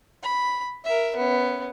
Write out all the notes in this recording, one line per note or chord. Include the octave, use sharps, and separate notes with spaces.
B5
A#4 E5
B3 C#4